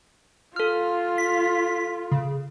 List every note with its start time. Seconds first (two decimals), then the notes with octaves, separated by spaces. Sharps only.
0.56 F4 A4 F6
1.18 B6
2.12 C#3